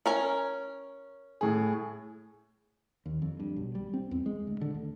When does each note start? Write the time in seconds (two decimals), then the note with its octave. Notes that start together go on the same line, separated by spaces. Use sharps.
0.06 C#4 A#4 G#5
1.41 A2 G#4
3.06 D#2
3.22 F2
3.40 G2
3.56 B1
3.75 G3
3.94 C4
4.11 E2
4.26 G#3
4.47 D2
4.61 D3
4.74 D2